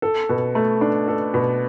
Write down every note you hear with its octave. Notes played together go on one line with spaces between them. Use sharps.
A4
B2
A3
D4
A4
B2